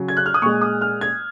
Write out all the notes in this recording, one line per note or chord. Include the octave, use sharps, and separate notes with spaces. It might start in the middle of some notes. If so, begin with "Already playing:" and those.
Already playing: C#3 F#3
G#6
F#6
F6
D#6
A#2 G#3 C#6
D#6
F6
G#6